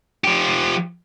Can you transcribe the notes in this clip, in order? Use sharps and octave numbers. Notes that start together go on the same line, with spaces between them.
F3 G4